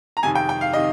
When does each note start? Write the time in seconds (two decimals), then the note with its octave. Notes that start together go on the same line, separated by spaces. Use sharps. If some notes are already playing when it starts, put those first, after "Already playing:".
0.17 A#5
0.23 F2 C3 D#3 G#5
0.35 G5
0.49 G5
0.61 F5
0.73 C3 D#3 D#5